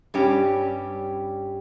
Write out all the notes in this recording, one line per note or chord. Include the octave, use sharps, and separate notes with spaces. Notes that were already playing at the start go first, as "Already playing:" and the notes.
G2 G3 C#4 G4